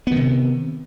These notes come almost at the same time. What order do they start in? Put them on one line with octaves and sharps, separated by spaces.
B3 D#3 C3